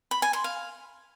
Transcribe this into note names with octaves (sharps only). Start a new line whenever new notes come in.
B5
G#5
C6
F5